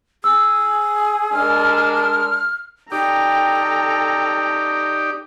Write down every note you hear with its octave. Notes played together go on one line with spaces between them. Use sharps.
G#4 E6
G#3 D4 A#4 F6
D#4 G4 A4 D5 G5 A#5